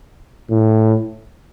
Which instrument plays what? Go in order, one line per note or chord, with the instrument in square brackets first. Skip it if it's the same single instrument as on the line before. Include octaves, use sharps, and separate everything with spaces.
[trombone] A2